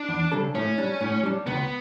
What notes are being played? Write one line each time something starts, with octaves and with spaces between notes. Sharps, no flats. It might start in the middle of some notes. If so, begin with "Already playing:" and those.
Already playing: D4
E2
C#3 G3 D4 A4
A2 C#4
G3 D4
A2
G3 D4
C#2 B3